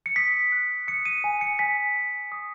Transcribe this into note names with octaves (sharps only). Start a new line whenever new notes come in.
C#7
D#6 B6
F#6
D#6 C#7
D#7
G#5
C#7
G#5 B6
G#5
D#6